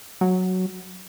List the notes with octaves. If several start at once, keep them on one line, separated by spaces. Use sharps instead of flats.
F#3